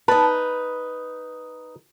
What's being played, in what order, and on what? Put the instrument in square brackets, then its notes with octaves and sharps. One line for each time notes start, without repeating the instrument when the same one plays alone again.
[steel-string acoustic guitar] D#4 B4 [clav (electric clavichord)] A5